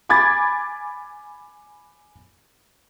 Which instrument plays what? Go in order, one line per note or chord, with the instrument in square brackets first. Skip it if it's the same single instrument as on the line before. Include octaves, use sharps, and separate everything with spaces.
[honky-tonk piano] G#5 B5 D6 G#6 A6